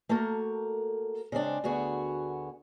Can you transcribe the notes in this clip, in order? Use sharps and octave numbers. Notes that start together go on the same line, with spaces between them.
A3 A#3 F#4 A4 A#4
C#3 G#3 C4 D4
D2 D3 B3 F#4 G#4